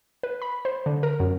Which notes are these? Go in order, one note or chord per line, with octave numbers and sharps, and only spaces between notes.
B4
B5
C5
D3
A#4
F#2